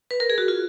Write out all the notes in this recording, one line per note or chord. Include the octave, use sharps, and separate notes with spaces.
B4
A#4
G#4
F#4
F4